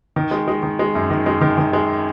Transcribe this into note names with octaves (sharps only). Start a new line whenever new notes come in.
D#3
G#3
G#3
D#3
G#3
F#2
D#3
G#3
D#3
D#3
G#3